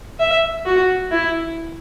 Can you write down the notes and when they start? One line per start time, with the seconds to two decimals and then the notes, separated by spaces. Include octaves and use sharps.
0.20 E5
0.65 F#4
1.11 E4